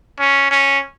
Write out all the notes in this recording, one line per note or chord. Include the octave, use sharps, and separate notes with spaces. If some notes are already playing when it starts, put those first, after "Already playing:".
C#4
C#4